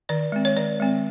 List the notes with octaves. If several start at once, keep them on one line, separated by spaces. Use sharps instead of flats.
D#3 D5
G#3 C4
C#5
D#3 D5
G#3 C4